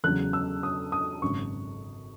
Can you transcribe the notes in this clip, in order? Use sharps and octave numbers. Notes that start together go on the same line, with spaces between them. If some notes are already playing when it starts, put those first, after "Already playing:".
E2 C#3 F#3 F#6
E6
D#6
D#6
G#1 F#2 C#3 C#6